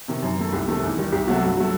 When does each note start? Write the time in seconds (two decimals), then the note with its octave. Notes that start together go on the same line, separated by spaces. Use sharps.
0.08 C3 D#3
0.23 F#2
0.37 D#3 A3
0.52 C2 G4
0.68 C3 D#3 A3
0.83 E2
0.97 D#3 G3
1.12 C2 G4
1.27 C3 F#3 A3 F#4
1.43 G2 F#4
1.57 F#3 A3